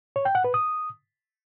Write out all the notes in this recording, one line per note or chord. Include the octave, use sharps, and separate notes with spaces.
C#5
G5
F#5
B4
D#6